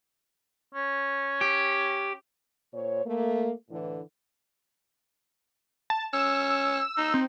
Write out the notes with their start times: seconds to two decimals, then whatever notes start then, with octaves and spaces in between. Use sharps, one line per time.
0.74 C#4
1.41 G4
2.74 A#2 C5 C#5
3.06 A3 A#3
3.70 A2 D3 E3
5.90 A5
6.13 C#4 E6
6.97 D#4
7.14 C4